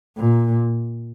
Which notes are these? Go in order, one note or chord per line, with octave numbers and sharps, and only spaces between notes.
A#2